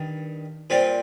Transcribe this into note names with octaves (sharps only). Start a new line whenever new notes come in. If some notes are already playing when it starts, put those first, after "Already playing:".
Already playing: G2 D#3
A#2 G3 C4